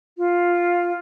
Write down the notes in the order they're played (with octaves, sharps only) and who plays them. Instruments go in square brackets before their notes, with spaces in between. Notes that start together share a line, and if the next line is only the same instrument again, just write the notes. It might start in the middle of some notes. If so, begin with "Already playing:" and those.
[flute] F4